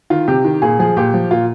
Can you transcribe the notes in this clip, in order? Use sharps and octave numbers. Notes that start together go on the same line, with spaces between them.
D#3 F4
C3 G4
D#3
A#2 G#4
F3 G#4
A#2 G4
F3
A#2 F4